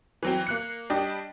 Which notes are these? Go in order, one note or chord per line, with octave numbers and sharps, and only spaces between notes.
E3 F#3 C4
A#3 F#6 C#7
G3 D4 G4 D#5